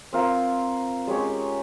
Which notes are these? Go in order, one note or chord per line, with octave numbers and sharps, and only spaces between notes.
C4 F4 A#4 F5
G#3 C#4 G4 C#5